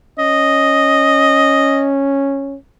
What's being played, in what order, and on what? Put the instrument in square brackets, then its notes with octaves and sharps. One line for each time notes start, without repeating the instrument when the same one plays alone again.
[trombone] C#4 [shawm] D#5